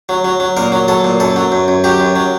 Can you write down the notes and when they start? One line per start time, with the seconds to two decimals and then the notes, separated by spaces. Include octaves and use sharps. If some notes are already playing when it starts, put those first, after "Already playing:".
0.09 F#3
0.24 F#3
0.40 F#3
0.57 A#2 A#4
0.72 F#3
0.88 F#3 A4
1.04 A#2
1.20 F#2 A4
1.36 F#3
1.52 F#2
1.68 F#2
1.84 F#3 G4
2.00 F#2
2.16 F#3